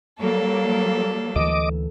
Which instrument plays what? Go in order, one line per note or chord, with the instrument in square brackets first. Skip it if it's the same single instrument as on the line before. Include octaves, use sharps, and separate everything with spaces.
[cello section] F#3 G3 A#3 [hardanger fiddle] A4
[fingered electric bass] D2 E3 [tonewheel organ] D#5 D6